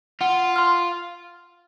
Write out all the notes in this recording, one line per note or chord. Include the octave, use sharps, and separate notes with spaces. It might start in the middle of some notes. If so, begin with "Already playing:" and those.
F4 F#5
C6 F6